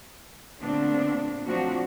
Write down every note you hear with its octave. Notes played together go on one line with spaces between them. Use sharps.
A#2 D3 A3 B3 C4 D4
F3 F#3 A3 C4 D4 F#4